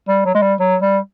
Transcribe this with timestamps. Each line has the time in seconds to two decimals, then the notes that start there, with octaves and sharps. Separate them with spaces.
0.09 G3
0.26 F#3
0.35 G#3
0.42 G3
0.60 F#3
0.82 G3